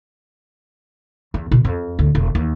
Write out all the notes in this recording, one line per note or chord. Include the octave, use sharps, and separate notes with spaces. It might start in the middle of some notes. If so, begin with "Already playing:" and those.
E2
B2 E4
F2
D2 A2
E1
D#2